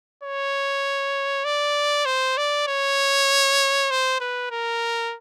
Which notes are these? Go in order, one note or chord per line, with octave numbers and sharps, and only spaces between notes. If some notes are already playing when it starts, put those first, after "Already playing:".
C#5
D5
C5
D5
C#5
C5
B4
A#4